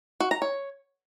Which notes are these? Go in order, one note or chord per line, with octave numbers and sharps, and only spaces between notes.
F#4
A#5
C#5